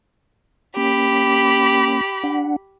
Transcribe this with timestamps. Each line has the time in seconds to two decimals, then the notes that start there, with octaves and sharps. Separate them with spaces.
0.77 A#3 C#4 G4 B5
2.24 D4 F#5